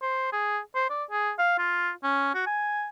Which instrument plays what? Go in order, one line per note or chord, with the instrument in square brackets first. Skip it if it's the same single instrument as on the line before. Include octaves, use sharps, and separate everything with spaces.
[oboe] C5
G#4
C5
D5
G#4
F5
F4
C#4
F#4
G#5